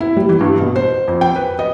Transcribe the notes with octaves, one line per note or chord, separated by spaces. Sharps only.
E4
G3
E3
G2
B2
C5
F2
G5
B4
D#5